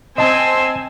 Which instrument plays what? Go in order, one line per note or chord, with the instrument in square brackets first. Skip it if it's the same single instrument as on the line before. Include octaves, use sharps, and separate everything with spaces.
[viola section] C4 G#5 [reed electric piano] D#5 A5 [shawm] C6 [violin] E6